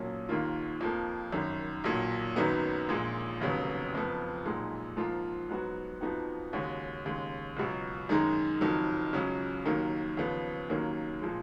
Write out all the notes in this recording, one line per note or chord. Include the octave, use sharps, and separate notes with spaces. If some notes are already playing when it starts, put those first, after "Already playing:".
Already playing: B1 A#2 F#3 A#3 C#4
D#2 D#3 A#3 F4
F2 F3 A#3
G#1 F#2 D#3
B1 A#2 F#3
G#1 F#2 D#3 F#3 B3
A#1 A#2 G#3
F1 D#2 C#3 F#3 B3
F#1 F2 F3 B3
B1 A#2 G#3 D#4
G#2 F3 A#3 F4
G#2 F#3 B3 F#4
F2 F3 B3 D#4 F#4
D#2 C#3 G#3 C#4 F#4
D#2 C#3 G#3
C#2 B2 F#3
F#2 D#3 G#3 D#4
F#1 F2 D#3 F#3
C#2 C#3 F#3 C#4
D#2 D#3 F#3 A#3
D#2 C#3 F3 B3
D#2 D#3 F#3 A#3 C#4
A#2 F3 G#3